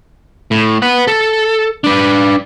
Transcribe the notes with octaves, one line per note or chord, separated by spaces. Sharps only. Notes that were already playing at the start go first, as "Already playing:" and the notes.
A2
B4 F#5
A4
D4 B4